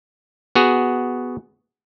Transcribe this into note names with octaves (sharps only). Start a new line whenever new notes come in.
B3 F#4 G#4